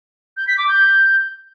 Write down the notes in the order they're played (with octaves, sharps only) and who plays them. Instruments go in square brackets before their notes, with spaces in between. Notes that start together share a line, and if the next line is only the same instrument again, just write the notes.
[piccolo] G6
B6
D6
G6